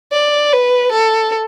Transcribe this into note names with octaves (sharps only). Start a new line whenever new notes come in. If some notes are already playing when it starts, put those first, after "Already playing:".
D5
B4
A4